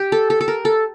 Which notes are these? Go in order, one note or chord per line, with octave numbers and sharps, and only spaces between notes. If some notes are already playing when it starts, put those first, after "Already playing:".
Already playing: G4
A4
A4
A4
A#4
A4